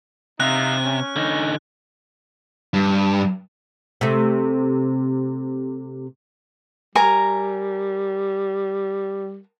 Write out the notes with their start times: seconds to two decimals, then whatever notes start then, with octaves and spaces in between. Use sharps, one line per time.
0.40 C3 D#4 E5 F5 F#6
0.84 C#4
1.16 D3 D#4
2.74 G2
4.01 C3 A3
6.95 G3 A#4 G#5 A#5